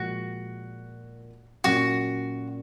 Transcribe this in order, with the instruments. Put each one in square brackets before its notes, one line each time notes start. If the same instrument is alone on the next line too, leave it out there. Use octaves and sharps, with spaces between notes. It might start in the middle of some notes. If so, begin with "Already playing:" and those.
Already playing: [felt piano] A#2 F3 G#3 [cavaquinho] F#4
[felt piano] A#2 F#3 C#4 [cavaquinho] F#4